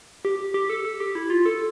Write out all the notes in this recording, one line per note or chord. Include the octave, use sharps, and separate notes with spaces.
G4
G4
A4
A4
G4
E4
F4
A4